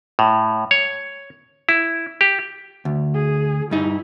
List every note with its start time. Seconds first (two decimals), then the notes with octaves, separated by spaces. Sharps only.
0.19 A2
0.71 C#5
1.69 E4
2.21 G4
2.85 D2
3.14 G#4
3.71 G2 D#4 E4